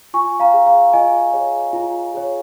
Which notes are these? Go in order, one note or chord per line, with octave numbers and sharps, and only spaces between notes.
F4 G#5 C#6
F5 A#5
G#4 C#5
F5 A#5
F4 D#5 G#5
G#4 C#5
F4
G#4 C#5